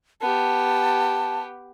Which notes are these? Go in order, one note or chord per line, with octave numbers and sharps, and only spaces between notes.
B3 G4 A5